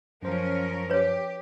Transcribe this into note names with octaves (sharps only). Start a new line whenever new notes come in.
F#2 F3 C#4 A#4 C5
G4 B4 C#5